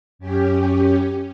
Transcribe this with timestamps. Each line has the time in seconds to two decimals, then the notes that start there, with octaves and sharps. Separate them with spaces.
0.19 F#2 C#4 G4